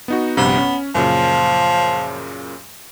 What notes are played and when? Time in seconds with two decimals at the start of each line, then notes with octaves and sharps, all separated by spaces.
0.08 B3 D#4 F#4
0.37 A#1 G2 C3 B3
0.58 C#4
0.95 F#2 A#2 C#3 F3